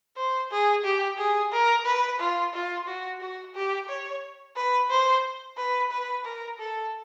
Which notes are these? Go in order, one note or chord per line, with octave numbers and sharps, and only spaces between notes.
C5
G#4
G4
G#4
A#4
B4
F4
F4
F#4
F#4
G4
C#5
B4
C5
B4
B4
A#4
A4